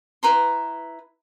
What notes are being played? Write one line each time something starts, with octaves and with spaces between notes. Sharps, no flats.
E4 B4 A#5 C6